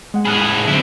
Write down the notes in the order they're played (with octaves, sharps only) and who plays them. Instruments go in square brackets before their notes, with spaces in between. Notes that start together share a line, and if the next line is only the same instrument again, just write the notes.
[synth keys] G#3 F#5
[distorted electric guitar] A2 G#4 [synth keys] B5 F6 F#6
[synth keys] D3 F#3 [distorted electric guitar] C4 E4